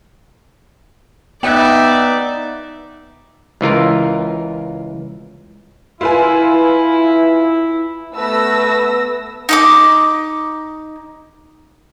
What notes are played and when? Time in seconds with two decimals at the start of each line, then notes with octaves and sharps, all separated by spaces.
1.43 B3 D#4 D5 E5 G5 F#6
3.61 C#2 E3 F4 A#4
6.01 E4 F4 B4 G#5
8.13 A3 B3 B4 E6 A#6
9.49 D#4 D#5 D6